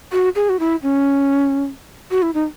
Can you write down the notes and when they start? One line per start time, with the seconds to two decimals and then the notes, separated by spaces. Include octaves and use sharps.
0.12 F#4
0.35 G#4
0.49 F#4
0.59 E4
0.83 C#4
2.11 F#4
2.22 E4
2.34 D#4